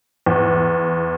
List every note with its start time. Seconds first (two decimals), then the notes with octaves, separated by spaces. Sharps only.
0.26 E2